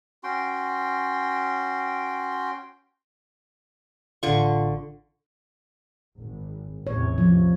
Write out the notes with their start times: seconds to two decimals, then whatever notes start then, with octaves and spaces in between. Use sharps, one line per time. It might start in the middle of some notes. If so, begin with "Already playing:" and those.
0.24 C#4 F#4 G5 C6
4.23 A1 D3 F4 C#6
6.19 G#1
6.87 A1 E2 C3 C#5
7.18 F3